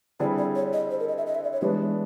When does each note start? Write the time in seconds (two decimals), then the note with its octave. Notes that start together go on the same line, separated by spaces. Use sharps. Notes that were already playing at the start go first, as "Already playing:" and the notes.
0.20 D3 G3 C4 E4 G#4 D5
0.38 D5
0.55 C#5
0.73 D#5
0.91 C5
1.00 A#4
1.08 D#5
1.18 E5
1.26 D#5
1.35 E5
1.44 D5
1.53 C#5
1.61 E3 G#3 B3 D4 G4